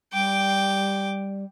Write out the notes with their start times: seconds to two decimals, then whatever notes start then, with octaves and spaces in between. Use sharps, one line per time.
0.13 G3 G5 D6